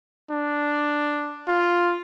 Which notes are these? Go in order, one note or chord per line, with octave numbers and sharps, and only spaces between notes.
D4
F4